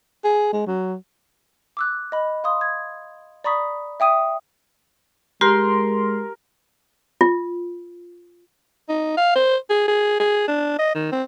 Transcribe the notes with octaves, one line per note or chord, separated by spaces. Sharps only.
G#4
G#3
F#3
D6 E6 F#6
D#5 B5
F5 C6 D#6
G#6
D5 A#5 B5 C#6 D#6 B6
E5 G5 D#6 D#7
G#3 G4 A#4 C6
F4
D#4
F5
C5
G#4
G#4
G#4
D4
D#5
D#3
C4